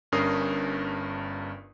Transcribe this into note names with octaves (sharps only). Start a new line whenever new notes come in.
G1 G2 C#4 A#4 D#6 C7